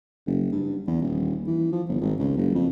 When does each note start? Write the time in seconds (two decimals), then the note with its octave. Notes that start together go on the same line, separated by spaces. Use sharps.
0.27 F#1
0.52 G2
0.87 E2
1.02 D#1
1.47 E3
1.72 F3
1.89 G1
2.01 G#1
2.20 C#2
2.37 F#1
2.55 F2